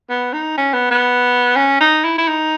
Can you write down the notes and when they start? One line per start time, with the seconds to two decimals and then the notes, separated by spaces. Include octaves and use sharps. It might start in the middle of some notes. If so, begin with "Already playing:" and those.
0.10 B3
0.33 D#4
0.58 C#4
0.74 B3
0.91 B3
1.56 C#4
1.81 D#4
2.05 E4
2.18 E4
2.28 D#4